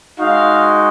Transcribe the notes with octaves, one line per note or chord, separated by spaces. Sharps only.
G#3 D#4 F#4 F5